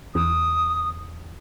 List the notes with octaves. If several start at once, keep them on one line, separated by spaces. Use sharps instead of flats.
E2 D#6